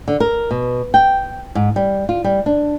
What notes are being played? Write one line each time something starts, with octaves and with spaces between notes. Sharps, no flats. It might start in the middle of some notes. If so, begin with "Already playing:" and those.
D3
A#4
B2
G5
G#2
G3
F4
G3
D4